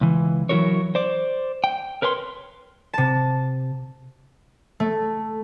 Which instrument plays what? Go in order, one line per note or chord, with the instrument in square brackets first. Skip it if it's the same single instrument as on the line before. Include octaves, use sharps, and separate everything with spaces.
[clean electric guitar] C#2 E3
E3 F#3 E4 F#4 A#4 C#5
C5 D5
G5
A#4 B4 C#5 A5 C6
[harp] C3 A5
A3